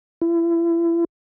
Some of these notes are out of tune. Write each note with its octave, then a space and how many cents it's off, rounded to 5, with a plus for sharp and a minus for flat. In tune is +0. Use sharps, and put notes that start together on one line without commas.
E4 +35